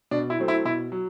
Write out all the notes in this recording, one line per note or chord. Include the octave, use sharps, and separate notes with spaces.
B2 D4
E4
F#3 A3 C4
E4
B2 E4
F#3